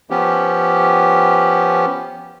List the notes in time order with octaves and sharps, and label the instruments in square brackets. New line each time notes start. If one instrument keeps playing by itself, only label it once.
[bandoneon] F3 B3 C#4 G4